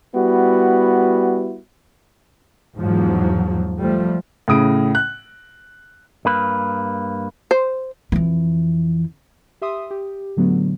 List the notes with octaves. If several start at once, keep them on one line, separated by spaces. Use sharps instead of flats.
G3 B3 E4 F#4
E2 G#2 F3 F#3
F3 G3 A3
A2 C#3 D#6 D7
F#6
G2 A#3 B4
C5
F2 E3
G4 E5 C6 D#6
G4
A2 D3 F#3 A3 B3